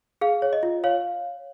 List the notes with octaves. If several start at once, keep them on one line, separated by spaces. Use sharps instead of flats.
G#4 F5
C#5
D#5
F4
C#5 F5